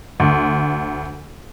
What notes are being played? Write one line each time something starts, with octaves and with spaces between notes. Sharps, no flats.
D2